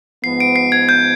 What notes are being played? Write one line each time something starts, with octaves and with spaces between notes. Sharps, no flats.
G#2 F3 B3 C7
D7
C7
G#6
G6